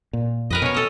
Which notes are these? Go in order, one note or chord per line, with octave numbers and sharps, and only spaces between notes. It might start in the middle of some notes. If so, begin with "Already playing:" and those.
A#2
F2 A#4 B4 D#5
B2 C#4 C#5
A4 D#5